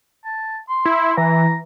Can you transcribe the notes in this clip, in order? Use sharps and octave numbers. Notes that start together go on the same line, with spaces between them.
A5
C6
E4
E3 A#5